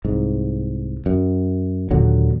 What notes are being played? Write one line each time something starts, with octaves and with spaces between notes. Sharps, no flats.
C2 G#2
F#2
D#2 A#2 D3 F#3